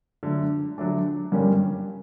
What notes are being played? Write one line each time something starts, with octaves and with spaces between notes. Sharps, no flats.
D3 F#3 A3 D4
D3 F#3 A3 D4
G2 D3 G3 A#3 C#4